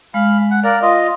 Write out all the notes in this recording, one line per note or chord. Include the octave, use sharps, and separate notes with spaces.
G#3 F5 B5
F#5
A#4 D5 F5
F4 D#5